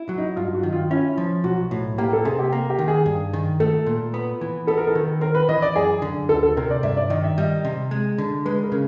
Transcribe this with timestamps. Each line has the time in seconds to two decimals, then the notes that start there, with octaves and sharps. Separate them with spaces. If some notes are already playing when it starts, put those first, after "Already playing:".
Already playing: E4
0.09 F#3
0.18 D#4
0.36 G2 F4
0.54 F#4
0.63 D#3
0.73 F4
0.90 C#4 E4
1.18 F3
1.44 B1 F#4
1.71 A2
1.98 A#3 G4
2.13 A4
2.25 C3 G#4
2.39 G4
2.53 A#3
2.70 G4
2.79 D#3
2.88 G#4
3.06 G2
3.34 D#3
3.60 A3 A4
3.86 A#2
4.14 B3
4.41 E3
4.67 B3 A4
4.78 A#4
4.87 A4
4.95 D#3
5.21 C4 A#4
5.35 B4
5.49 E3 D#5
5.62 D5
5.76 F#2 G#4
6.02 D3
6.29 D2 A4
6.43 A4
6.57 C3 A#4
6.71 D5
6.83 G2 E5
6.97 D5
7.10 D#3 D#5
7.24 E5
7.38 G3 D#5
7.65 C3
7.91 G#3
8.18 D3
8.45 G#3 B4
8.63 A#4
8.72 C#3